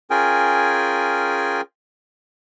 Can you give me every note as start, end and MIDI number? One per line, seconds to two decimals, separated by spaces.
0.10 1.61 61
0.10 1.61 65
0.10 1.61 68
0.10 1.61 70
0.10 1.61 79
0.10 1.61 80